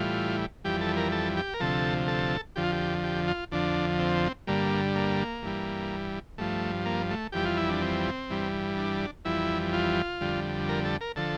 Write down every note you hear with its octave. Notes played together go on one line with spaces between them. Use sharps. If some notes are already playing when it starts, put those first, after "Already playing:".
Already playing: A2 E3 G3 F4
F2 E3 G3 G4
A4
A#4
A4
G4
A#4
D2 C3 F3 A4
A4
F2 D3 F3 G4
F4
G4
G4
F4
F2 D3 F3 D4
C4
G2 D3 G3 A#3
A#3
G2 E3 G3
G2 F3 A3
A#3
A3
F2 E3 G3 G4
F4
E4
D4
C4
G2 E3 G3
D4
F2 E3 G3 E4
F4
F2 D3 G3
A#4
A4
A#4
D3 F3 A4